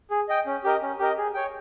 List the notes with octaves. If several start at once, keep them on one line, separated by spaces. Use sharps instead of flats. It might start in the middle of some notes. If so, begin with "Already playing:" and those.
G#4
D#5 G5
C#4
G4 A#4 D#5
C#4
G4 A#4 D#5
G#4
C#5 G5